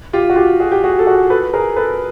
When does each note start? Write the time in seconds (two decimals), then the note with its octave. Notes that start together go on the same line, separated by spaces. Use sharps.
0.13 F4 G4
0.30 F#4
0.36 F4 G4
0.60 F#4 G#4
0.72 G4
0.84 F#4 G#4
0.99 A4
1.06 F#4 G#4
1.30 A4 B4
1.54 G#4 A#4
1.76 A4 B4